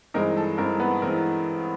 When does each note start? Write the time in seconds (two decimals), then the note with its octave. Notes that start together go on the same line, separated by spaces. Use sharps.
0.14 G2 E3 G#3 C4 D#4 A#4
0.37 A4
0.58 G2 E3 G#3 C4 D#4 A#4
0.80 B3 B4
1.02 E3 G#3 C4 A#4